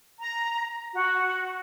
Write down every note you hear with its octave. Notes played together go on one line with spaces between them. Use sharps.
A#5
F#4